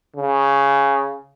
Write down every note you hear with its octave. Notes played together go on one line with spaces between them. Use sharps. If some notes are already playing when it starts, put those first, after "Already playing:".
C#3